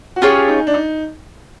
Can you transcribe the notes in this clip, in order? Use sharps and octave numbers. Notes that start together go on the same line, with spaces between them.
F#4
C#4 F4 G4 G#4 C#5
D#4
D4
D#4